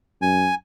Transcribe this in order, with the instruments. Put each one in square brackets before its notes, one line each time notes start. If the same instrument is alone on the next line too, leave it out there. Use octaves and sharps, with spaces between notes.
[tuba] F#2 [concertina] G#5